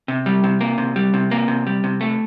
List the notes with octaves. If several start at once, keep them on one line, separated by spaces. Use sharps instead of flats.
C3
G3
C3
A#3
C3
G3
C3
A#3
C3
G3
C3
A3